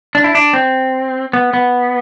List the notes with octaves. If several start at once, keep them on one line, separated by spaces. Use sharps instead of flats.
D4
E4
D4
C4
B3
B3